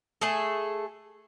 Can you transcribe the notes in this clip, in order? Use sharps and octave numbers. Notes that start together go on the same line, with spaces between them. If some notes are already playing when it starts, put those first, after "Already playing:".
A3 G#4 A4